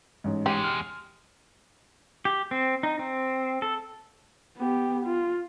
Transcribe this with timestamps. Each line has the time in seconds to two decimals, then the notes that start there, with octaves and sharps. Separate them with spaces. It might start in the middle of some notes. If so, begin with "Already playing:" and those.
0.24 A1 G#2
0.46 E2 G#3 G4
0.64 F6
2.25 G4
2.51 C4
2.83 D#4
2.99 C4
3.62 A4
4.58 B3 G4
5.06 F4